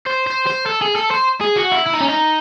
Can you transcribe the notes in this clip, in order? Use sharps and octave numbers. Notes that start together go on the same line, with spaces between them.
C5
C5
C5
A4
G#4
A4
C5
G#4
F#4
E4
E4
D#4
C#4
D#4